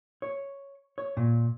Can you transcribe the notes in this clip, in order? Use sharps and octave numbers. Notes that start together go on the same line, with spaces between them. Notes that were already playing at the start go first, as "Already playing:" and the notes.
C#5
C#5
A#2